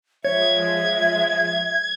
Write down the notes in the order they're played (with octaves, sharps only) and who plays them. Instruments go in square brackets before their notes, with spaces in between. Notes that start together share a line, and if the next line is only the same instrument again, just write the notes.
[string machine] F3 G#3 [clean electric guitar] C#5 [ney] E5 [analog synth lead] G#6